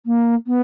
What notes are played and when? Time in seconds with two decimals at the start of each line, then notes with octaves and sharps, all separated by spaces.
0.06 A#3
0.47 B3